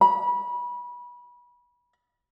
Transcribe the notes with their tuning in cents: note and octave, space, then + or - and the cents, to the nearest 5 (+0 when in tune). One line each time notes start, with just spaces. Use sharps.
B5 -25